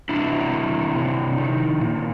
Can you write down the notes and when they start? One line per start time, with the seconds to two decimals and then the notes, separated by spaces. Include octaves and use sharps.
0.09 C3 D4 E4
0.53 D#3
0.95 C3
1.38 D#3
1.80 A#2